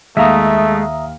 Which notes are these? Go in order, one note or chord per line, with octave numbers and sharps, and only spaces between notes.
D#2 G#3 A3 E5 F5 A#5 D#6